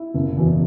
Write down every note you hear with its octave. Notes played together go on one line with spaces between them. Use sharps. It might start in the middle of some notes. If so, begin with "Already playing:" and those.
Already playing: E4
F#1
E2 B2